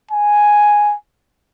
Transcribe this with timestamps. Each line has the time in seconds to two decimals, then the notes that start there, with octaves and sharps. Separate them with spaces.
0.11 G#5